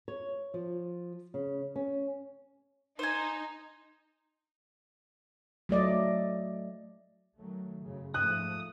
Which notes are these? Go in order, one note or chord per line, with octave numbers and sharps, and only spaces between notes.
C#5
F3
C#3
C#4
D#4 C5 G#5
F#3 A3 D5 D#5
D#3 F#3 A3
F#2 C#3
G#2 F3 A3 D#6 F#6